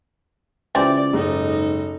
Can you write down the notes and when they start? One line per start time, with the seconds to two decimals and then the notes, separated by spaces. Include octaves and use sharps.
0.75 C#2 E3 G3 C4 D5 A6
1.13 F#1 G#2 D#4 A4